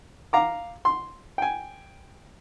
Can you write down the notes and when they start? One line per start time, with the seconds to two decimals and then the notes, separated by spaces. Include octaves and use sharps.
0.33 F5 A#5 D6
0.85 C6
1.38 G5 G#5